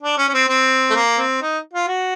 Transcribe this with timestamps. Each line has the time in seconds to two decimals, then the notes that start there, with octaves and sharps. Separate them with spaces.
0.03 D4
0.18 C#4
0.29 C#4
0.34 C4
0.48 C4
0.90 A3
0.95 A#3
1.18 C4
1.42 D#4
1.73 F4
1.88 F#4